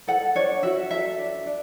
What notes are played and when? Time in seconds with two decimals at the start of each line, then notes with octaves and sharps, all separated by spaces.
0.08 A4 F#5
0.35 D4 C#5
0.63 F#4 E5
0.91 A4 E5
1.18 D4
1.46 D4